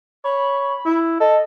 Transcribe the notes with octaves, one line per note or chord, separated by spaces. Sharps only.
C#5 B5
E4
A4 D#5